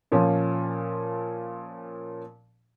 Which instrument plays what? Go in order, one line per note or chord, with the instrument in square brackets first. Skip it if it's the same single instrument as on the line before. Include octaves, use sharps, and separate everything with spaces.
[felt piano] A#2 F3 C#4